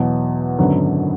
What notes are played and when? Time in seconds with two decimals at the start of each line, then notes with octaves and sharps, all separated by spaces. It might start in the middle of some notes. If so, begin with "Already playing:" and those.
Already playing: E2 B2 F#3
0.59 G#1 F#2 D3 F#3 B3